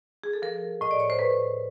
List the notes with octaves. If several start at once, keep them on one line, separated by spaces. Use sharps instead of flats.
G#4
A4
F3 A#4
A2 D#5
D5
C#5
C5
A2 B4